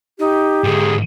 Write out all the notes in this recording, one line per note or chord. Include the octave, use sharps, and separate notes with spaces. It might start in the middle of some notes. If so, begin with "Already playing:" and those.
D#4 G4
G#2 D3 G#4